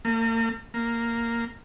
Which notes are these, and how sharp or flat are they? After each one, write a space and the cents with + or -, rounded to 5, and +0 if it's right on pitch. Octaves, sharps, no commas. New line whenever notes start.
A#3 -40
A#3 -5